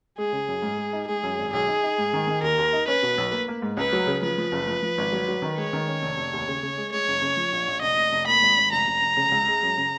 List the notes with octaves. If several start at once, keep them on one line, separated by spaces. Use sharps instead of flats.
G#3 G#4
C#3
F#2
G#2
G#3
D#4
G#3 G#4
F#2
G#1
B1 G#4
D#4
D#4
G#2
D#3
D#3
D#2 A#4
D#2
D#4
C#4 B4
B2
B1
A#3
A#3
G#2
C#2 B4
F#3
C#3
F3 B4
F3
F#1
F3
F3
G#1
F#3
F#3
D#3
G#3 C#5
D#3
C#4
F1
F1
D#2
C#3
C#3
G#3
G#3 C#5
F#1
C#3
F3
A#1
A#1
F1 D#5
F1
F1
A#3 B5
G#1
G#1
F1 A#5
F1
F1
C#3
C#2
G#3
F#2
C#3